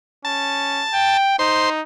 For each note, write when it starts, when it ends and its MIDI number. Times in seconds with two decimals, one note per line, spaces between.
0.25 0.84 61
0.25 1.17 81
0.94 1.37 79
1.39 1.81 63
1.39 1.70 72